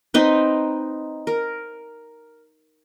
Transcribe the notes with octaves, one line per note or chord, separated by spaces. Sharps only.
C4 D#4 B4
A#4